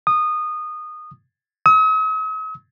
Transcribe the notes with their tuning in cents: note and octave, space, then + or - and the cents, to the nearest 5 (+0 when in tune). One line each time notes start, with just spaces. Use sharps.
D#6 -20
D#6 +45